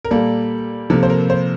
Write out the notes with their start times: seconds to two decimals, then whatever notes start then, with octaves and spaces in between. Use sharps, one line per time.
0.05 A#4
0.11 A#2 G3 A#3 A4
0.90 C3 F3 A#3 A4
1.03 C5
1.10 A#4
1.30 C5